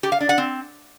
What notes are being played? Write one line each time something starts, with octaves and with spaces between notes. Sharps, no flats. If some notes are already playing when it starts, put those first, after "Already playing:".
G4
F5
D4
F#5
C4